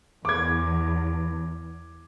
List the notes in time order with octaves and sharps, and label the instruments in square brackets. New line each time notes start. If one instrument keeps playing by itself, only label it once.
[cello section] E2 [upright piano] D6 G#6